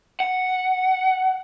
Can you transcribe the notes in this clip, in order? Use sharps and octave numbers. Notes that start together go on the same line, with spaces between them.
F#5